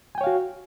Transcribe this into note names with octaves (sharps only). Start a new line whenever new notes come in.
F#4 C#5 F5 G5 G#5